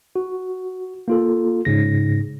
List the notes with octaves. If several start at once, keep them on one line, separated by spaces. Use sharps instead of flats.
F#4
A#3 F4 A4
G#2 C#3 A#6